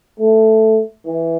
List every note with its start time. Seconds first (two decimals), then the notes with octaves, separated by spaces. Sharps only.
0.20 A3
1.06 E3